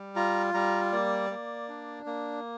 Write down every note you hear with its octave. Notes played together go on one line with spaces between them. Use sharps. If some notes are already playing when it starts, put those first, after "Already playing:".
Already playing: G3
F4 A#5
G3 A#5
A#3 D5
A#3
D4
A#3